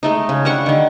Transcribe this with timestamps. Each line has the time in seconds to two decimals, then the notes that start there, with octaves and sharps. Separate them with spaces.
0.03 G#3 A3 D#4
0.29 C#3
0.45 G3 D4 F#5 C#6
0.66 D3 D#3